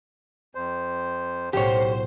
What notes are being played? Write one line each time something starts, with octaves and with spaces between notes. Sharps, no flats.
F2 C5
B1 A2 G4 C5 C#5